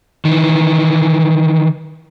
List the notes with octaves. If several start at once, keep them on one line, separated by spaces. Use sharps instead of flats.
D#3 E3